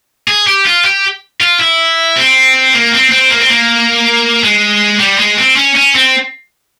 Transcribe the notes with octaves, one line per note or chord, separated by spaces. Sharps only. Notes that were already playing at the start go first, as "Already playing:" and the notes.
G#4
G4
F4
G4
F4
E4
C4
A#3
C4
C4
A#3
C4
A#3
G#3
G3
G#3
C4
C#4
C#4
C4